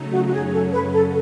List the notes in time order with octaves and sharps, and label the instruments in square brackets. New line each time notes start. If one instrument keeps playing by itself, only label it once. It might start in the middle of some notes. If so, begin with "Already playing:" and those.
Already playing: [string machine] C#3 F#3 A3 D#4
[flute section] F#4
F#4
[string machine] F#2 C#3 F#3 C#4 [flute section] G#4
[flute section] A4
B4
A4